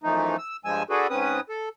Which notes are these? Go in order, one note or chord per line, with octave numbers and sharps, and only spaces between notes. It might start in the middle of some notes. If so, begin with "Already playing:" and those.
F#2 E3 F3 A3 D#4
E6
G2 F3 G#3 G#5 E6
D4 F#4 G#4 A4 B4
G#2 C4 C#4 B4 D#6
A4